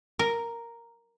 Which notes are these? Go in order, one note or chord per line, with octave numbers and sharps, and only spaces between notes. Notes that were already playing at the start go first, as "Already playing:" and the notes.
A#4